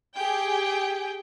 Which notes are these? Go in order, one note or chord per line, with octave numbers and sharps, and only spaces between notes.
G4 G#4 G5